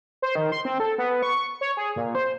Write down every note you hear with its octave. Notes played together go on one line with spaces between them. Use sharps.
C5
D#3
C6
C4
A4
B3
C#6
C#5
G#4
A#2
C5